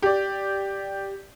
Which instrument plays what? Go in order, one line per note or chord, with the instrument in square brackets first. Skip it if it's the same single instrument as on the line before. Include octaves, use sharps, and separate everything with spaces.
[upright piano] G4 D5